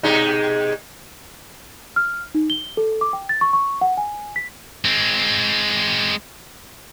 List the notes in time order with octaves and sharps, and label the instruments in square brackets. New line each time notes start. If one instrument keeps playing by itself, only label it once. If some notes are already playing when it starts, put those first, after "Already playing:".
[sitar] B2 G#3 D#4
[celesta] F6
D#4
G7
A4
D6
G5
A6
C#6
C#6
F#5
G#5
B6
[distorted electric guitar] G#3 C4